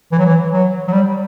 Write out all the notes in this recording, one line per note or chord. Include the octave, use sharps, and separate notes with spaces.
E3
F#3
E3
F#3
F#3
G3